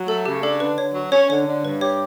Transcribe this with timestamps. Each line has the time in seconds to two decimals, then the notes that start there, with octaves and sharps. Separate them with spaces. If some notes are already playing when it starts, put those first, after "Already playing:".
Already playing: F#3
0.08 A3 A4
0.26 C#3 G4
0.43 D4 A4
0.60 D3 B4
0.78 D3 C#5
0.95 F#3
1.12 C#4 C#5
1.30 D3 C#5
1.46 D3
1.64 G2 B4
1.81 G4 C#5